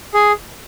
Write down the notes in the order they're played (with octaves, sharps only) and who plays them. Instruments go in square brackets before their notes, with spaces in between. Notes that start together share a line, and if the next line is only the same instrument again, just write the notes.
[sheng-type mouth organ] G#4